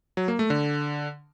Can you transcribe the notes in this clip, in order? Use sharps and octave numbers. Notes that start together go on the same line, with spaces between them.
F#3
A#3
A3
D3